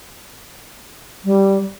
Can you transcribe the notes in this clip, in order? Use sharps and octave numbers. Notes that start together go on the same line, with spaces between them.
G3